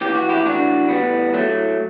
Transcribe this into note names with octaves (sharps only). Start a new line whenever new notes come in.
E3 G4
F#4
E4 G4
A2 D4 F#4
E3 G3 B3
A2 F#3 A3